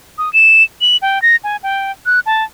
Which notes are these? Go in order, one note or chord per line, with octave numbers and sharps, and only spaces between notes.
D#6
E7
F#7
G5
A#6
G#5
G5
F#6
A5